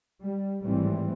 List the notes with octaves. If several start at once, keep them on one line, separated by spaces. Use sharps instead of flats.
G3
G#1 A2 E3 G3 C4